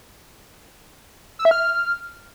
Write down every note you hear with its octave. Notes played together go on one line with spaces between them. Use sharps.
E6
E5
F6